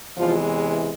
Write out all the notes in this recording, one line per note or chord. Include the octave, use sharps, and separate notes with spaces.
E2 C3 E3 F3 G#3 F4